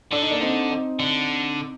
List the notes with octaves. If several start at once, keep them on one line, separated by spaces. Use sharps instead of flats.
D3 D4
D#4
A#3 D4
C4 D#4
C4 D#4
D3